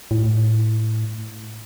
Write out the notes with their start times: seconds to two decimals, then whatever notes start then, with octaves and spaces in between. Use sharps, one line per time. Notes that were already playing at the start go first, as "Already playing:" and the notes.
0.11 A2